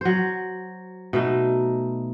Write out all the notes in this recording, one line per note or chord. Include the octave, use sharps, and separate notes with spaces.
F#3 C5
B2 A3 D#4